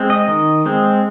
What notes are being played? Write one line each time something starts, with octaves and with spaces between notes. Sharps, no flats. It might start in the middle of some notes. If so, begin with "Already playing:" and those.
Already playing: G#3 C4
D#5
D#3
G#3 C4